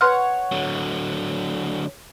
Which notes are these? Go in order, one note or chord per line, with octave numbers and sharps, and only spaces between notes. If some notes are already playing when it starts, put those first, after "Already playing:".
B4 C#5 F#5 C6 F6
D3 F#3